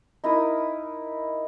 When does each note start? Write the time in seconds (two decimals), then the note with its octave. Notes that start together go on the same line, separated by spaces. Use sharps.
0.24 D#4 E4 A#4 D#6